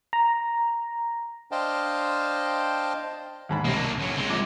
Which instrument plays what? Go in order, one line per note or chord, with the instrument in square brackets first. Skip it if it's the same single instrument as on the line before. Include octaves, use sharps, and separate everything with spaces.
[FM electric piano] A#5
[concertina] D4 C5 D#5 F5 G5 A5
[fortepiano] D#2 G#2 B5
[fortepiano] C2 C3 [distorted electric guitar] A#3 D4
[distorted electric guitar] C#2 F#3
G#3 C4
[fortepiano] A#1 D6